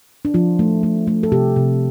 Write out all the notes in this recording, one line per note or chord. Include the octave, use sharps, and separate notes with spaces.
D4
F3 F4
A3
A3
A3
A4
C3 G4
C3